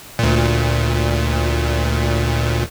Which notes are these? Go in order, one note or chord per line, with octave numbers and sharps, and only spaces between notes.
D2 A#2